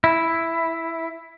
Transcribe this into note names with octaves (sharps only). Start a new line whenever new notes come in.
E4